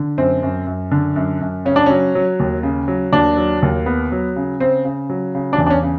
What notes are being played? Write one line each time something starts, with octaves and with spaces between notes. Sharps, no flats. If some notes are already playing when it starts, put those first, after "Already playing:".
Already playing: D3
F#2 C4
F#2
F#2
D3
F#2
F#2
C#3 C#4
D4
F#3 C#4
F#3
D#2
C#3
F#3
D#2 D4
F#3
D#2
B3
F#3
C#3
C#3 C4
C#3
F#3
C#3
D4
E2
D4
C#4
C#3